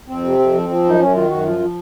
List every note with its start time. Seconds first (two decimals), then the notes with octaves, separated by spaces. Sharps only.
0.08 F2 C4
0.24 C3
0.39 F2
0.54 F3
0.69 F3
0.84 F#2 D#4
0.99 F#2 C#4
1.14 D#3 F4
1.30 F#2 F#4
1.45 F3 F4
1.60 F3